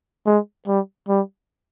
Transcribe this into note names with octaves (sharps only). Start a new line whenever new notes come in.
G#3
G3
G3